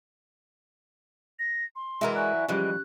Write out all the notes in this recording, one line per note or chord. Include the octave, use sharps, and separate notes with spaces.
A#6
C6
E3 F#3 G#3 E4 A#4
D5 G#5 C#6 F#6
E3 F3 G3 G#3 C#4 G4 F#6